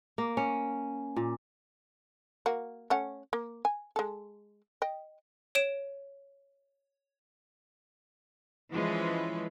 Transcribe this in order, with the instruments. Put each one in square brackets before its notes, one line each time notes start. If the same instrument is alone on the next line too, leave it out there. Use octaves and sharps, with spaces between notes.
[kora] A#3
C#4
A#2
[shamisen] A#3 F#4
A3 C#4 F#5
A#3
G#5
G#3 A4
D#5 G5
[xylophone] C#5 D7 E7
[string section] E3 F3 G#3 C#4 B4